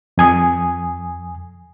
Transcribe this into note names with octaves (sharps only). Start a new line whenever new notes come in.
F2 G#5 D#6